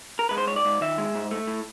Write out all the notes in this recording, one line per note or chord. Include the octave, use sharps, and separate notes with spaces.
A#4
G#3 B4
C5
G#2 C#5
D5
G#2
D#3 E5
G#3
G#2
A3
A2